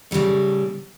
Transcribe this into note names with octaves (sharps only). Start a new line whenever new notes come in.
A2 C#3 F3 G3 A3